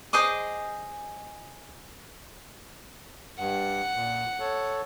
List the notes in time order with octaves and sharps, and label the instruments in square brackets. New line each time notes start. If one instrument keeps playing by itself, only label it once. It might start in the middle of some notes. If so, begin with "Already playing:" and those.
[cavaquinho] G#4 C5 D#5 D6
[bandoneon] G2 [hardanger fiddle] F#5
[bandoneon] A#2
A4 C#5